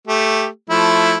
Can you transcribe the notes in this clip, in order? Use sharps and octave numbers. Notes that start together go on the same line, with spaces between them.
A3 G4
F3 A3 E4